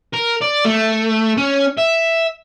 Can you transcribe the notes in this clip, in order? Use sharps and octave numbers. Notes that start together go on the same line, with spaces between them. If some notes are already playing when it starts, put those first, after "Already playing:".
A#4
D5
A3
C#4
E5